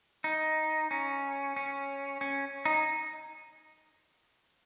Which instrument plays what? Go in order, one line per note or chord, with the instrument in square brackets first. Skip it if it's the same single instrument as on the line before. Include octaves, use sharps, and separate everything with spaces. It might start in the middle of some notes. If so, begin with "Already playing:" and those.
[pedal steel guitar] D#4
C#4
C#4
C#4
D#4